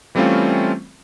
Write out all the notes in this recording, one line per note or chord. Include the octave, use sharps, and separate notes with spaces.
E3 G3 A3 C4 C#4 F4